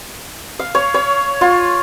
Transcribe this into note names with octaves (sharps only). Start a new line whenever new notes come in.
F5
C#5
C#5
F4